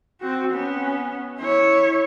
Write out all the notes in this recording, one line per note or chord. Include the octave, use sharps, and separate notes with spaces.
C4 F#4
B3 C#4
E4 C#5